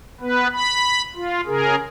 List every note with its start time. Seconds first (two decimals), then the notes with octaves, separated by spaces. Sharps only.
0.21 B3 B4
0.52 B5
1.15 F4
1.47 C#3 G#4 A#4